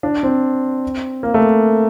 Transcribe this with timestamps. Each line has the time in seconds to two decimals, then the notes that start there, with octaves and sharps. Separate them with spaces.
0.03 D4
0.23 C4
1.23 A#3
1.34 A3